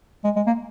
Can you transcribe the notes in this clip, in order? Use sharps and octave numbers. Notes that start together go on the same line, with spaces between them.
G#3
G#3
A#3